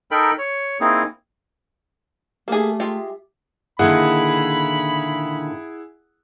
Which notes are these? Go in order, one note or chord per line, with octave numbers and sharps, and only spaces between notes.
D#4 A4 A#4 G5 B5
C#5
A#3 C4 D#4 E4 G#4
A3 A#3 G4 G#4 E5
G#3 F4 G5
A#2 D3 D#3 E4 G#4 F#5 B5